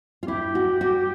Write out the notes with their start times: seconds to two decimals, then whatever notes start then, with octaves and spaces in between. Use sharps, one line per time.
0.23 F4
0.28 E4 G4
0.55 F#4
0.81 F#4